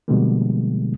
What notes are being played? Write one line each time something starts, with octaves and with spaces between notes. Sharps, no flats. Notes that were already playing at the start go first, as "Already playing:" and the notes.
B2 D3 F3 G3 G#3 A#3